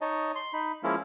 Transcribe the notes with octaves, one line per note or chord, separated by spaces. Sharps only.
D#4 C#5 D#5 A5
C6
D#4 B5
F3 G#3 A#3 C#4 E4 F4